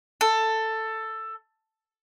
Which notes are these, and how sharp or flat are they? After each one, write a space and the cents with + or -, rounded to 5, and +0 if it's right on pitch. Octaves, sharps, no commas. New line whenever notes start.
A4 +10